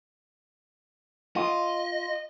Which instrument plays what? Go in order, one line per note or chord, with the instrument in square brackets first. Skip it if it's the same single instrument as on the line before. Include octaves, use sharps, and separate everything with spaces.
[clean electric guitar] F4 [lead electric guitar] D#5